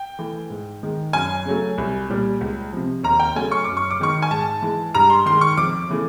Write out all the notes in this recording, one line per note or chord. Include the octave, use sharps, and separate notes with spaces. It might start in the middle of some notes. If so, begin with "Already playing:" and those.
Already playing: G5
E3 A3
G#2
D#3 G#3
F#2 G#5
C#3 F#3 A3
C2
A#2 G3
C#2
C3 F3
D#2 A#5
G5
C#3 F#3 A3 G#5
C#6
F#2 D6
C#6
D6
D#3 G#3 C#6
G#5
G#2 A5
E3 G#3
G2 A#5
C6
D#3 G#3 C6
C#6
F2 D6
C#3 E3 A3